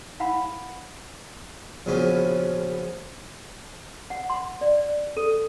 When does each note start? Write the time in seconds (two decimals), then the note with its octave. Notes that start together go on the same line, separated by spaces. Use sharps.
0.20 E4 F5 F#5 A5 B5
1.86 A#1 C#3 F3 B3 C#4 F#4
4.10 F#5
4.30 C6
4.61 D5
5.17 A4